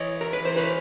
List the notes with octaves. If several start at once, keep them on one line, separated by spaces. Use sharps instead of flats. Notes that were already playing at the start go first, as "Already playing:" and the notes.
Already playing: E3 C#5 D#5
A#4
B4
E3 C5
B4 C#5